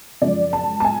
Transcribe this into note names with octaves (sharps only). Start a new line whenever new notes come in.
F#2 C#3 F3 G#3 D5
A5
A5
G#5